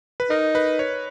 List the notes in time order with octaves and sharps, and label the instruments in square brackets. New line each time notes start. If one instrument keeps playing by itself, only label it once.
[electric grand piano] B4
[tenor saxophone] D#4 [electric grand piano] A#4
[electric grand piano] B4
C#5